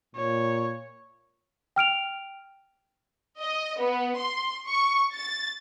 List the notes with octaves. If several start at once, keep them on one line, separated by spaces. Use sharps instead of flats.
A#2 C#5
G5 F6 D7 F7
D#5
B3
C6
C#6
A6